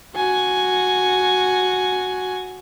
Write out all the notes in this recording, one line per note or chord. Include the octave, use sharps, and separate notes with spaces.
F#4 G#5